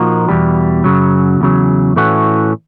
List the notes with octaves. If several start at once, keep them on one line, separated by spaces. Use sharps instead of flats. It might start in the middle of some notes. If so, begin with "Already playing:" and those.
Already playing: A#2 F3 A#3 D#4 F#4
E2 B2 G3
F#2 C#3 F#3
E2 C#3 F#3
A2 E3 A3 C#4 F#4